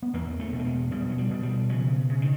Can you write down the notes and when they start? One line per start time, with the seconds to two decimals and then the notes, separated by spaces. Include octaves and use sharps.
0.02 B3
0.14 E2 A#3
0.40 A3
0.53 B2
0.60 A3
0.65 G#3
0.91 B2 G3
1.10 F#3
1.18 G3
1.30 B2
1.43 G3
1.69 C#3 F3
2.09 C#3
2.22 D#3